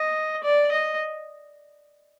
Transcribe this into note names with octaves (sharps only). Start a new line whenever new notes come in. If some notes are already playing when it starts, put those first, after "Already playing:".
Already playing: D#5
D5
D#5